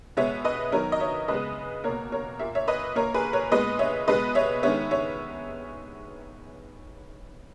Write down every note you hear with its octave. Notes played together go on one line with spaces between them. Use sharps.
B2 G#3 B3 C#5 E5
B4 D#5
D#3 F#3 B3 A#4 C#5
D#5
C#5 E5
C#3 G#3 B3 B4 D#5
B2 A#3 A#4 C#5
A#4 C#5
A#2 A#3 E5
C#5 E5
B4 D#5
A#2 A#3 A#4 C#5
G#4 B4
A#4 C#5
A#2 G#3 B3 B4 D#5
C#5 E5
B2 G#3 B3 B4 D#5
C#5 E5
D#3 G#3 B3 C#5 E5
C#5 E5